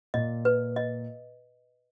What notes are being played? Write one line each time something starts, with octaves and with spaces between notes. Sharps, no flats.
A#2 D#5
B4
D#5